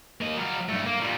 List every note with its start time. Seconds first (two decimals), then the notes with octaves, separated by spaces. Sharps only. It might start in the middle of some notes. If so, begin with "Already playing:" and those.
0.21 A#3 D#5
0.37 F#3 F5
0.69 G2 A3
0.86 A#3
1.00 A#2 G3